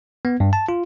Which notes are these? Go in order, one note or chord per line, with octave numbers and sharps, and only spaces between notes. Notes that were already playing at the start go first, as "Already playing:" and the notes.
B3
G2
A5
F4